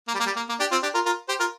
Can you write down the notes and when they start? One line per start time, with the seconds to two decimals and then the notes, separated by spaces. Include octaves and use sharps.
0.08 A#3
0.15 G3
0.20 A#3
0.26 G3
0.37 A#3
0.49 A#3
0.60 D4 G4
0.71 C4 F4
0.83 D4 G4
0.94 F4 A#4
1.06 F4 A#4
1.28 G4 C5
1.40 F4 A#4